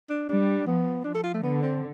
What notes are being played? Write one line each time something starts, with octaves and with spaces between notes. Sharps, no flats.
D4
G3 D4
F3 B3
F3 D4
A4
F4
A3
D3 B3
C4